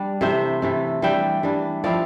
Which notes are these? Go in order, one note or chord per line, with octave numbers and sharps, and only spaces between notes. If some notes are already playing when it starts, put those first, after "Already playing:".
Already playing: G3 D4
C3 E3 A3 C5 E5
C3 E3 A3
E3 G3 D4 E5 G5
E3 G3 D4
F3 C4 E4 D5 F5